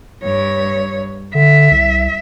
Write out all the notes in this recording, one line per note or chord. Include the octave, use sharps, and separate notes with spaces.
G2 C#5
D3 E5
C2